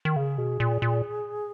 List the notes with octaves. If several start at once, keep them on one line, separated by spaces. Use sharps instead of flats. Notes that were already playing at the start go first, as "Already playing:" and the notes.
D#3
C#3 G#4
B2
A#2
A#2